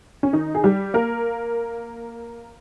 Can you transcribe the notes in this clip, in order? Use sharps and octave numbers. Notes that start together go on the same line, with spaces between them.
C#4
D#3 D#4
G#4
G3 G4
A#3 A#4